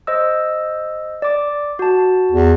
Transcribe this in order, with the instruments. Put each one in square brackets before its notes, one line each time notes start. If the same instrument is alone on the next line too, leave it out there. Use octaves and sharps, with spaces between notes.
[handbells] C5 D#5 E6
D5 D6
F#4 A5
[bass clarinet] E2